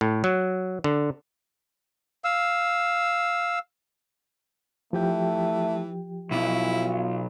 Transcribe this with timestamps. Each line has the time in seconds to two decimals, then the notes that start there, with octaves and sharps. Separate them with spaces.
0.01 A2
0.24 F#3
0.84 D3
2.24 F5 E6
4.93 E3 F3 A3 G4 G5
6.31 B1 E4 F4